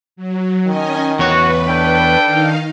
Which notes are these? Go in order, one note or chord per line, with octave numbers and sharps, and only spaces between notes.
F#3
D#3 C#4 D#5 G#5
E2 F#4 B4 C#5
D4 A4 G5
D#3 D#4 F5